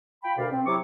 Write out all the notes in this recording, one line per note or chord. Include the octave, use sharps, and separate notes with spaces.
F4 G5 B5
D2 B2 A#4 D5 F5
C4
C3 F#3 E4 C#6 D6